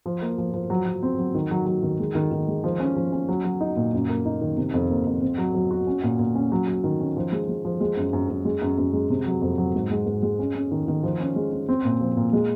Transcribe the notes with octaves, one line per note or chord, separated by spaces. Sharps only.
F3
A#3
F3
F3
F#3
F#3
C4
F#3
D#3
F#3
F#3
D#3
G#3
D#3
D#3
G#3
F3
C#4
F3
C#4
F#3
F#3
D#4
A#2
F#2
A#3
D#4
D#3
C3
F2
A#3
F2
C4
F#3
F#3
F#4
C#4
A#2
A#2
C#4
F#3
F#3
D#3
C#4
F3
G#3
G#3
F3
G#3
F#2
F#2
F#2
G#3
F#2
F#2
G#3
C3
F#3
F2
F#3
G#2
G#3
G#2
G#3
C#4
C#4
D#3
D#3
F3
C#4
G#3
C#4
C4
A#2
F3
A#2
G#3